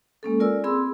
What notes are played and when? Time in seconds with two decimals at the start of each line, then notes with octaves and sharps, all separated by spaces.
0.23 G#3 A#3 C#4 A4
0.40 F4 A#4 D5 G#5 E6
0.64 C4 G#4 B5 C6 E6